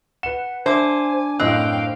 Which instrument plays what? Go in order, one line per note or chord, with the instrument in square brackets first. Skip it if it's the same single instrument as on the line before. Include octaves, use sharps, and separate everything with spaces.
[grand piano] B4 E7 [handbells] F#5
[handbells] D4 D6 [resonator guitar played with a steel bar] C5 [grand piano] E5 [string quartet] G#5
[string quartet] F#2 F5 G5 [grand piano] A2 D#5 F#6 [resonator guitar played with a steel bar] C4